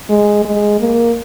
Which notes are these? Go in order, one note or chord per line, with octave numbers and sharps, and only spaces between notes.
G#3
G#3
A#3